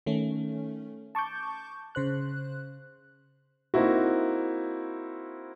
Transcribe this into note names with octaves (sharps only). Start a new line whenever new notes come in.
D#3 A3 C#4
A5 C#6 D6 G6
C#3 C5 F#6
A#3 C4 D#4 E4 F#4